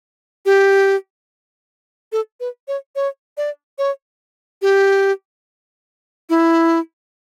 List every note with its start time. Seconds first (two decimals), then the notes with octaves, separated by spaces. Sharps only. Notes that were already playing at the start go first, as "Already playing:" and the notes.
0.46 G4
2.12 A4
2.40 B4
2.68 C#5
2.96 C#5
3.37 D5
3.78 C#5
4.62 G4
6.30 E4